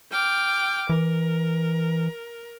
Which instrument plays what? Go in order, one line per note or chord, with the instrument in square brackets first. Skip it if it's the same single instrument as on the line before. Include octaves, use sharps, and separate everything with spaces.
[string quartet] G5 D6 F6
[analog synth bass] E3 [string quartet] A#4